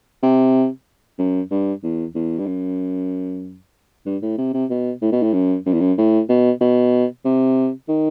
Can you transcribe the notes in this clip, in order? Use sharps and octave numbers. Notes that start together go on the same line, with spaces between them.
C3
F#2
G2
E2
E2
G2
F#2
G2
A2
C3
C3
B2
A2
B2
A2
F#2
F#2
E2
F#2
A2
B2
B2
C3
D#3